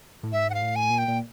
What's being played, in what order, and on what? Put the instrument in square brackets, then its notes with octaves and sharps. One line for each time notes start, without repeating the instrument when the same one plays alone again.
[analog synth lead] A2
[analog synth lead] G#2 [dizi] E5
[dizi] F#5
F5
[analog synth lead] A2
[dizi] G#5
[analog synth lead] A#2
[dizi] G5
[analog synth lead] A#2